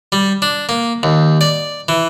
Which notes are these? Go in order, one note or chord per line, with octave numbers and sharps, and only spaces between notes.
G3
D4
A#3
D#2
D5
E3